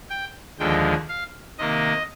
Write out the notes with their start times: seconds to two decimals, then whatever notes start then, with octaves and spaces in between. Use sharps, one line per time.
0.10 G5
0.59 D#2 D3 F3 G#3 G5
1.08 F5
1.58 C3 D#3 A#3 D#5